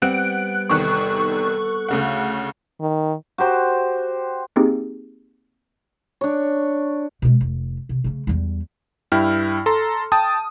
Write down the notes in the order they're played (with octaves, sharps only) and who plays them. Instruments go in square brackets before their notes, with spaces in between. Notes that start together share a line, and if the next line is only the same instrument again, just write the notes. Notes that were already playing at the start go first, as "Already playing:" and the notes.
[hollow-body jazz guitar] G3 B3 C4 [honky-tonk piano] F#5 [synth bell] F#6 D7
[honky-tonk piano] E2 C3 D#3 [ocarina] A4 [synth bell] C#6 F#6
[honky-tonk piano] D2 C#3 F#5
[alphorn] D#3
[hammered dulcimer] F#4 G4 C5
[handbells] A#3 C4 D#4 G4 G#4
[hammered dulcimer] D4 C#5
[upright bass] B2 G#3
F1
C3
C#3 A3
E2 G3
[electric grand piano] G2 E4 G5 F6
A4 A#5 C6
G5 A5 D#6